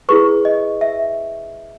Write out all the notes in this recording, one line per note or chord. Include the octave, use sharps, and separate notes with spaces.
E4 G#4 B4 C#6
D#5
E5